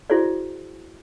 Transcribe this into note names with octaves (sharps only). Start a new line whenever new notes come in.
E4 F#4 G#4 C5 D5